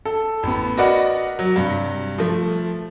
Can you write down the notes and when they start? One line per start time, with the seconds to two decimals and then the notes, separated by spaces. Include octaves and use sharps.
0.05 A4
0.43 A1 B3
0.77 F#4 A#4 B4 D5 D#5 F#5
1.39 F#3
1.56 G2 C3
2.18 F3 A3